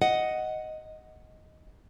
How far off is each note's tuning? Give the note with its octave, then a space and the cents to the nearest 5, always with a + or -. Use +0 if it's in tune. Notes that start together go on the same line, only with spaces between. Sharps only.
D#5 +5 F#5 +0